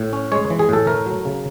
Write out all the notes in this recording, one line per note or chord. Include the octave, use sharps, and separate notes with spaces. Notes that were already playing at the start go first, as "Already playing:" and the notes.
Already playing: A2
C#4
G#3 C#5
E3
G#4
A2 A4
A3 A#4
F#3
C#3